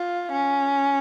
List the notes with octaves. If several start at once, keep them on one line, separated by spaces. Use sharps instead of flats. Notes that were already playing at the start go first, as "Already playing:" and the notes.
Already playing: F4
C#4